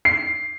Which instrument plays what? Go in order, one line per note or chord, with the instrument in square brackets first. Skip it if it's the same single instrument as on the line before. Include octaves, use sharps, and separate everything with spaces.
[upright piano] C7